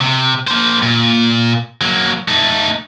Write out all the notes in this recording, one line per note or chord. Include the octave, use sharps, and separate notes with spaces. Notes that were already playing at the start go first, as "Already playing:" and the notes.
C3
A#3 C5
A#2
F#3 A#3
A3 D#4